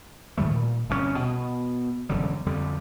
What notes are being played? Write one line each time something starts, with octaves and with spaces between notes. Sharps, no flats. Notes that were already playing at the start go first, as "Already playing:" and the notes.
G#2 D#3 G3 A3
A#2
G1 C2 A#2 C#4
B2
E1 F#2 D3 G3
F2 D3 G3